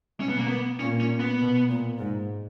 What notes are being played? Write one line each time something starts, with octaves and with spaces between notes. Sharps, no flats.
B2 C#4
B3
A#3
B3
A#2 C#4
C#4
B3
B2
A#2
G#2